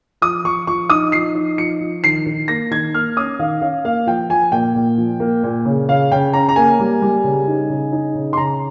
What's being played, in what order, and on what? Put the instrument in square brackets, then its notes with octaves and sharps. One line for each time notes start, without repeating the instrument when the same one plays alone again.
[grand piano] F3 D#6
F3 C#6
F3 C#6
D#4 D#6
F3 C7
D#4
F3 C#7
F3
D#3 C7
D#3
A#3 A#6
D#3 G#6
A#3 F6
C#4 D#6
D#3 F5
C#4 F5
A#3 F5
F3 G5
F3 G#5
A#2 G5
A#2
F3
A#3
A#2
C#3
C#3 F5
C#3 G5
C#4 A#5
A#5
A#3 G#5
G3
G3
C#3
D#4
C#3
D#4
C#3
C6
C#3 A#5